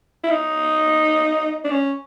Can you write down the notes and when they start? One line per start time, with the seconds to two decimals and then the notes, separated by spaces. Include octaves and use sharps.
0.24 E4
0.30 D#4
1.64 D4
1.71 C#4